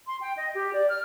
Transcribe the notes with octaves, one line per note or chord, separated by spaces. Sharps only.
C6
G5
D#5
G4
D5
F6